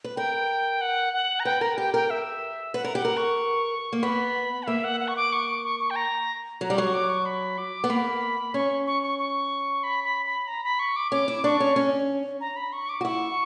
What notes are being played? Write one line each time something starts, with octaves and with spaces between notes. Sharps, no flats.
B4
A#4 G5
F#5
F#5
A#5
B4 G5
A#4 A#5
G4 G5
A#4 G5
E5
B4 F#5
A#4
G4 F#5
A#4
C#6
A#3
B3 B5
F#5
A#3 E5
F#5
F#5
C#6
D6
C#6
D6
C#6
C#6
G5
A#5
F#3 A#5
G3
F#3 C#6
D6
C#6
B5
D6
B3
A#3 B5
C#4 C#6
C#6
C#6
C#6
B5
B5
B5
A#5
B5
C#6
D6
C#4 D6
E4
D4 C#6
C#4
C#4
A#5
B5
C#6
D6
F#4
E4 C#6